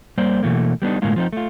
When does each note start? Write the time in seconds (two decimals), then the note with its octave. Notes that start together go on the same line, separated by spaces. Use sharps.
0.18 G3 A#3 C5 D5
0.43 B2 E3 A3 A#3
0.82 G3 B3 D4 D#4
1.02 A2 D3 G#3 A#3 F4
1.16 F3 C4 D#4
1.33 A3 F4